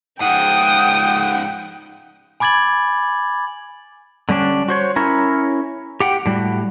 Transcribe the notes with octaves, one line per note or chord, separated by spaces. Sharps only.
G#2 F3 F#5 G5 D#6
G#5 B5 D6 G#6 A6 F#7
D3 G3 C#4 D4
F#4 C5 C#5
C#4 E4 A#4 C#5
G4 F#5 G5
A2 G3 F#4